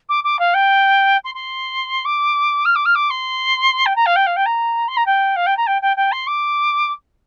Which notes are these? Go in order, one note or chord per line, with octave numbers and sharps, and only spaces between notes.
D6
D6
F5
G5
C6
C6
D6
F6
D6
F6
D6
C6
G5
A#5
F5
G5
F5
G5
A#5
C6
A#5
G5
F5
G5
A#5
G5
G5
G5
C6
D6